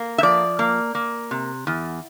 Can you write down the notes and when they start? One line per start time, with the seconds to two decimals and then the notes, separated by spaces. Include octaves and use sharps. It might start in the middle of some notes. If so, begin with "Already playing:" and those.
Already playing: A#3
0.18 E5
0.23 F3 D5
0.59 A#3
0.95 A#3
1.31 C3
1.67 E2